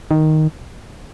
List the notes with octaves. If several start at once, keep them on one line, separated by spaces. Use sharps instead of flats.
D#3